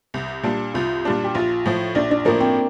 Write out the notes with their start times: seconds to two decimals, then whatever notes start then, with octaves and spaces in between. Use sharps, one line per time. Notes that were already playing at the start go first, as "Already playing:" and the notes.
0.14 C2
0.43 A#2 G3 D4
0.74 C2 F4
1.05 A#2 G3 D4
1.24 G4
1.35 A#1 F4
1.66 A2 F3
1.95 A#1 D4
2.11 D4
2.25 A2 F3 A#3
2.40 C4